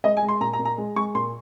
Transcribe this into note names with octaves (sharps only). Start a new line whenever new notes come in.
G#3 D#5
G#5
G#3
C6
A#2 A#5
A#5
A#2
A#5
G#3
G#3 C#6
A#2 C6